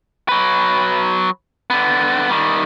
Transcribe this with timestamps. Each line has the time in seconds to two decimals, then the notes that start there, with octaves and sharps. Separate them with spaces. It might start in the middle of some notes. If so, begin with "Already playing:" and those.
0.29 F#3 B4
1.70 D3 B3
2.29 D#3 G3